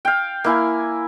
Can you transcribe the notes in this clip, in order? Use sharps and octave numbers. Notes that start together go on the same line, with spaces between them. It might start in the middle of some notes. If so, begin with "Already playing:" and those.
F5 G5
A#3 E4 G#5